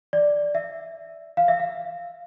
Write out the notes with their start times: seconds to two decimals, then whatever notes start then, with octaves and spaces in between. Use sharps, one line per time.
0.13 D5
0.55 E5
1.37 F5
1.48 E5
1.60 F5